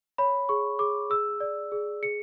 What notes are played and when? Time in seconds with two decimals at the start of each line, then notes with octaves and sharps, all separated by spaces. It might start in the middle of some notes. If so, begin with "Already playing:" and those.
0.18 C#5 B5
0.49 G#4 C#6
0.79 G#4 D6
1.10 G#4 E6
1.40 D5
1.72 G#4
2.03 G#4 C#7